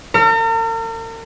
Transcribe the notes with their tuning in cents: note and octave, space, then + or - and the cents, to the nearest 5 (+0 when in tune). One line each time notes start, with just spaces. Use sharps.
A#4 -45